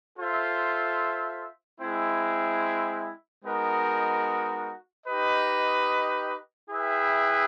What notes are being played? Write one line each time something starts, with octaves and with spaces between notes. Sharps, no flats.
F4 A4 C5 E5
G#3 C4 E4
G#3 B3 D#4 F#4 A#4
D#4 G4 B4 D#5
E4 G#4 B4 E5 G5